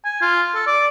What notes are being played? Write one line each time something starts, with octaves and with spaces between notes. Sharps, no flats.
G#5
F4
A4
D5